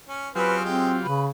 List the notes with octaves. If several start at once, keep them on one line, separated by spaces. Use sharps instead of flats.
C#4
F#3 C4 C#4 F4 G4 G#4 B4
G#3 C4 G5
C#3 B4